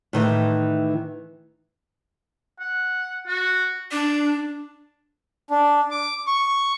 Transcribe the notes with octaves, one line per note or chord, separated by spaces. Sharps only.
A2 D#3 E3
F#5
F#4
D4 D5
D4
D6
C#6